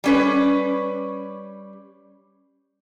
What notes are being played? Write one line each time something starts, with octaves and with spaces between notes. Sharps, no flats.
G3 C#4 B4